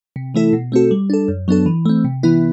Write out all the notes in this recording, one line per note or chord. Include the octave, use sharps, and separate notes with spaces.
C3
E3 A3 E4 A4
B2
A3 C4 F#4 A4
G3
D4 A4
F#2
F#3 B3 D4 A4
E3
A3 C4
C3
E3 B3 E4